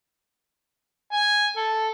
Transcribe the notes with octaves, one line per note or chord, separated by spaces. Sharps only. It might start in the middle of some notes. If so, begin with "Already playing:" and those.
G#5
A4